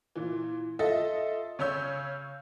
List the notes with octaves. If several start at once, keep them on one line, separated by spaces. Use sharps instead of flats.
A#2 E3
F4 A4 D#5 E5
C#3 C#4 C#5 E6 G6